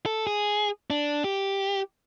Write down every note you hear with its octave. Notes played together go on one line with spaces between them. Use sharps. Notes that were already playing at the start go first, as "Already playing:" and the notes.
A4
G#4
D4
G4